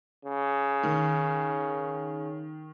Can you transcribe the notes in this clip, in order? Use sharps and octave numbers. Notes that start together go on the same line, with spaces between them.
C#3
D#3